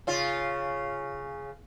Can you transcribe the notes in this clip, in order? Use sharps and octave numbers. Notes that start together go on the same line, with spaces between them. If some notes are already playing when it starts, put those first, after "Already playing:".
C#3 F4